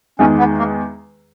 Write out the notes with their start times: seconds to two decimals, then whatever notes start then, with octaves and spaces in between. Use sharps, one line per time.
0.19 E2 D#3 G#3 C#4
0.38 B3
0.58 A#3